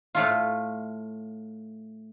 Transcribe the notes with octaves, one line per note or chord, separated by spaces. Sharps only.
A2 A3 F4